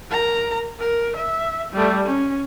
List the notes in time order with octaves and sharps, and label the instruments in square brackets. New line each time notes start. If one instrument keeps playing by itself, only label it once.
[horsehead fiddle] A#4 A#5
A#4
E5
G3 A3
C#4